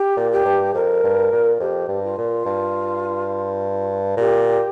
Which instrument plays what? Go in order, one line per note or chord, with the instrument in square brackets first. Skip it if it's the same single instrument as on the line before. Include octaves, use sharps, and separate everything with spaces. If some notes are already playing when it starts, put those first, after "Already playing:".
Already playing: [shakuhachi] G4
[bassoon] A#2
[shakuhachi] G4
[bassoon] G2
[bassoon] F2 [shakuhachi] A#4
[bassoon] G2
A#2
[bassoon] F2 [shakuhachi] G4
[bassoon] G2
[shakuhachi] F4
[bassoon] A#2
G2
[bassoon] A#2 [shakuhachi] G4